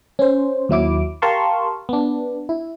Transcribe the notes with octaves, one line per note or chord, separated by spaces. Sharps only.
C#4 C5
D#2 F#3 E4 D6
G4 A#4 F5 A5 C6 C#6
B3 D4
E4